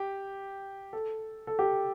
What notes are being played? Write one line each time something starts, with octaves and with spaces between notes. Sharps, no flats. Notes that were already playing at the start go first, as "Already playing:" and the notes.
Already playing: G4
A4
A4
G4